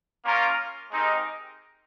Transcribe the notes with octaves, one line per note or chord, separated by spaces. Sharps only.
A#3 C#4 F4 A#4
G#3 C4 D#4 G4 A#4